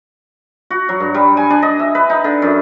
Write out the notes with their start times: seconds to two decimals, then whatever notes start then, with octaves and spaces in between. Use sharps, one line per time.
0.70 F#4
0.89 F#3
1.00 G2
1.14 G3
1.37 G#5
1.50 D4
1.62 D#5
1.79 E5
1.95 B4
2.10 D#4
2.24 D3
2.42 F#2